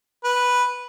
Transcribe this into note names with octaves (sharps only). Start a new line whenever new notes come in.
B4